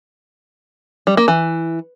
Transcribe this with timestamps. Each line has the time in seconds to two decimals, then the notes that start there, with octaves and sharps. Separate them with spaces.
1.07 G3
1.17 A#3
1.28 E3